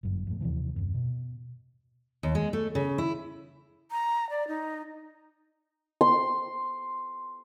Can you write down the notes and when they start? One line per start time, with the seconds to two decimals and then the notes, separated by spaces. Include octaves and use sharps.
0.03 G1 F#2
0.27 F2 A2
0.41 D#2 C3 E3 F3
0.76 D#1 F#2
0.94 B2
2.23 D#2
2.35 G#3
2.53 A3
2.75 C#3
2.98 E4
3.91 A#5
4.30 D5
4.48 D#4
6.01 C6